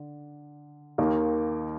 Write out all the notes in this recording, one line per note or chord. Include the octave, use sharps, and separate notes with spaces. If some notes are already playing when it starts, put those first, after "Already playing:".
Already playing: D3
D#2 D#3 A#3